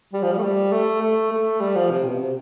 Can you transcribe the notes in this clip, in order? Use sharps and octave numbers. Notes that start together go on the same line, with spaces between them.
G3
F3
G3
A3
G3
A3
A3
A3
G3
F3
C3
B2
C3